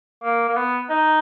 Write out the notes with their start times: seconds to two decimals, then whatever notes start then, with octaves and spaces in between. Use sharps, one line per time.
0.23 A#3
0.49 A#3
0.56 B3
0.89 D#4